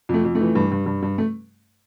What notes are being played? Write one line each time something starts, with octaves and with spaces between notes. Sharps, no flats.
F2 A3
F2
A3
E3
G2
G2
G2
G2
A3